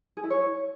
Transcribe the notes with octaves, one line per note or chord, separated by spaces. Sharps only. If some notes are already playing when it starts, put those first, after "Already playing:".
G#4
E4
C#5